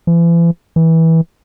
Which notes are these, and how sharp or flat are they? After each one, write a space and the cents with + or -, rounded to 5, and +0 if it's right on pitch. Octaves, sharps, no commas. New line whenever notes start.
E3 +40
E3 -20